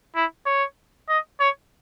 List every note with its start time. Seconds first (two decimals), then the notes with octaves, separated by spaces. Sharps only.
0.16 E4
0.46 C#5
1.09 D#5
1.40 C#5